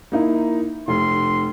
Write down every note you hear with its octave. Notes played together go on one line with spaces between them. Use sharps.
A#3 D#4 E4
F1 C6